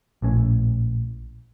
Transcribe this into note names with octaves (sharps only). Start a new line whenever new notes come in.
A#1 A2 C#4